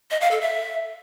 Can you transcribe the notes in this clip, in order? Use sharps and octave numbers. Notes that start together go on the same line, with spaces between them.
D#5
F5
A4
E5